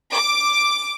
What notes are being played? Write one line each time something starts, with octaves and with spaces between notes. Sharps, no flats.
D6